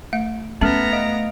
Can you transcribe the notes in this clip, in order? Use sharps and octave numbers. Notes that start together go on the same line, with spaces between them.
A3 E5
A3 B3 C#4 E5 A#5 F6 A6
D#5 F5 D7